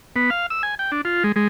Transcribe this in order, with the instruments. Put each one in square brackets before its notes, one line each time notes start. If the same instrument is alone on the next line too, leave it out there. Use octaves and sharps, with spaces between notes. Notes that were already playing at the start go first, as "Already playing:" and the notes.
[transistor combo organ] B3
F5
E6
G#5
G5
D4
F4
G#3
G#3